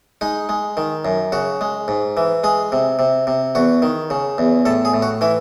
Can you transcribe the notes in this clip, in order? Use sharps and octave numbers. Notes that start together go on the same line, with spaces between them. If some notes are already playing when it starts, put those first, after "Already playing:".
G#3 D#4
G#3
D#3
F#2
C#3 F#4
G#3
G#2
E3
G#3 G#4
C3
C3
C3
E2 F#4
D#3
C#3
E2
A2 A4
G#4
A2
F#4
E3 E4